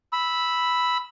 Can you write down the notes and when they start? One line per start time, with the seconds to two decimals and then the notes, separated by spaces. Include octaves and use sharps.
0.13 B5 E6